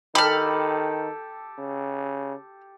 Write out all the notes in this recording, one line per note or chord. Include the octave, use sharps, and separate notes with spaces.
D#3 G4 A4 B5 F6
C#3